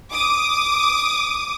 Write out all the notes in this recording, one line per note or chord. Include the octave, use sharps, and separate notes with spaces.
D6 D#6